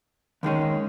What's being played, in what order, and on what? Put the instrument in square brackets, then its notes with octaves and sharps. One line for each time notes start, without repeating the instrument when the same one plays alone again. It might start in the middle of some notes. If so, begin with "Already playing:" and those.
[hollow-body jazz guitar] D#2 D#3 G#3 C#4